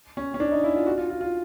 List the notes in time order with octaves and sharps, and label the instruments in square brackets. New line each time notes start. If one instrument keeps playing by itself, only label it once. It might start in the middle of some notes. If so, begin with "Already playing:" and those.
[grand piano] C#4
C#4
D4
D#4
E4
F4
F#4
F4
F4
F4